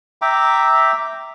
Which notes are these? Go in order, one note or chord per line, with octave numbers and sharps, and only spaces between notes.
E5 G5 A#5 D6